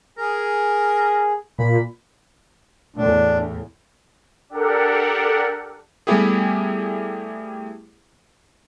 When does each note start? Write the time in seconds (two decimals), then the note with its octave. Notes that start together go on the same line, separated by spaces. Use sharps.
0.18 G#4 A#4
1.59 A#2 B5
2.96 E2 A2 D4
4.49 D4 G4 A4 A#4 F#5
6.07 G3 A3 B3 E4 G4 G#4